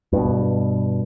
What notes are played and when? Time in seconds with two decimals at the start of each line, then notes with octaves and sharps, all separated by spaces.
0.13 G2 B2